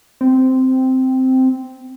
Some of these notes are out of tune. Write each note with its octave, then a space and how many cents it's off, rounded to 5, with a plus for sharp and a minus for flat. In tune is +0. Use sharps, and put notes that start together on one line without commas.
C4 -10